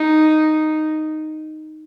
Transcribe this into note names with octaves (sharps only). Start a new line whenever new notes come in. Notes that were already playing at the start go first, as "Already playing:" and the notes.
Already playing: D#4